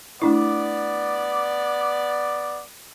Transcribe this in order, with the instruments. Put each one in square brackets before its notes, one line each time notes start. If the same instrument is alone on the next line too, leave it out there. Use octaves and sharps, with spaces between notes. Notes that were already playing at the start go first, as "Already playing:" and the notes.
[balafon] A3 D4 E4 [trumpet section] B3 D5